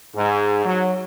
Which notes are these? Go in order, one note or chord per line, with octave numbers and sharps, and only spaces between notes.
G#2
F#3